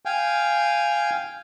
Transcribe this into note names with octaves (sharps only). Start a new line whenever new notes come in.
F5 G5 G#5